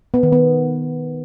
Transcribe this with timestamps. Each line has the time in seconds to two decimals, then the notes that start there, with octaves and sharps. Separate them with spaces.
0.14 B3
0.23 D#3
0.32 B3